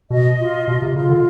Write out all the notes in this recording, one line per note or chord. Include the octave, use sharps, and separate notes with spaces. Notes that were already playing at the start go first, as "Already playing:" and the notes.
B2 D#5
F4
B2 F4
C3
C#3 F4
D3